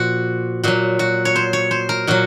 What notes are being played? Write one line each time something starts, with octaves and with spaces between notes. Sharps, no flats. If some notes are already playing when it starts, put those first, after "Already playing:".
Already playing: A#2 F3 F#4
A#2 F#3 F#4
F#4
C#5
C5
C#5
C5
A#4
A#2 F#3 F#4